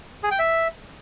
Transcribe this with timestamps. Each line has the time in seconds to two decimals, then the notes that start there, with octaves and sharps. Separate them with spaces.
0.23 G#4
0.31 G5
0.39 E5